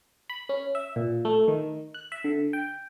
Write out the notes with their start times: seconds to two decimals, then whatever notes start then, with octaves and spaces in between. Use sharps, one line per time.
0.30 B5
0.49 C#4
0.75 E5
0.96 A#2
1.25 A3
1.48 D#3
1.94 F#6
2.12 E5
2.24 D3
2.53 G5